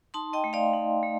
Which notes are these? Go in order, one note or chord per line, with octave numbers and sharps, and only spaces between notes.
D#4 A5 C6
D#5 G5
A3
D5 F5
D#4
A3